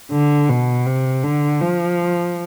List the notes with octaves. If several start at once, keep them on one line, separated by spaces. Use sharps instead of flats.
D3
B2
C3
D3
F3